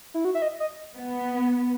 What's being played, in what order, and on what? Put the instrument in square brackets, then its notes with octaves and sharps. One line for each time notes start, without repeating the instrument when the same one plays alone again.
[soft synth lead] E4
F#4
E5
D#5
D#5
[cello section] B3